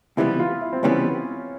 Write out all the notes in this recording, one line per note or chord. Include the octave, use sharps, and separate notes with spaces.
C#2 C3 E3 G3 B3 E4
F4
E4
C4
C#2 C3 E3 G3 B3 C#4